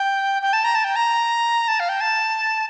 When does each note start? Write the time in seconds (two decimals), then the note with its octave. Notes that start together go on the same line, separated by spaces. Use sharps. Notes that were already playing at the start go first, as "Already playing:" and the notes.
Already playing: G5
0.42 G5
0.53 A5
0.64 A#5
0.75 A5
0.84 G5
0.96 A#5
1.68 A5
1.80 F5
1.89 G5
2.01 A5